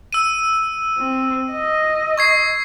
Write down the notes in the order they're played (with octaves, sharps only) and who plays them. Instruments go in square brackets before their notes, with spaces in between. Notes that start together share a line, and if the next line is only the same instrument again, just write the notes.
[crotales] E6 D#7
[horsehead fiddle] C4
D#5
[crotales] C#6 G#6 C7